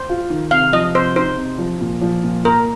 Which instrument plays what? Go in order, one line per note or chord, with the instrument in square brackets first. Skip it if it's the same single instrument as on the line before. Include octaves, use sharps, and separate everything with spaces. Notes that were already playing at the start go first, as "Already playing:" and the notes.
Already playing: [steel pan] C5
[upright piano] F4
D#3
[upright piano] C3 [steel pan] F5
[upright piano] F3 [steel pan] D#5
[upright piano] C3 [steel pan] C5
[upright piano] D#4 [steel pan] C5
[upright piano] C3
F3
A#2
F3
A#2
[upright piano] A#3 [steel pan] A#4